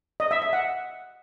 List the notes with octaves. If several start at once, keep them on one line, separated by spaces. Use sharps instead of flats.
D#5
E5
E5
F#5